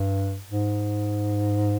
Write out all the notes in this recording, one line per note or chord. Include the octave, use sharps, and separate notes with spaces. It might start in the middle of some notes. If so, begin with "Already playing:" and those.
Already playing: G2
G#2